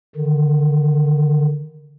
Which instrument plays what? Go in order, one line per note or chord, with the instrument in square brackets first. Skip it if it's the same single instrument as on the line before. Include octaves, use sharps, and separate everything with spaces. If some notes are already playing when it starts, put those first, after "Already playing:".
[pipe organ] D3 D#3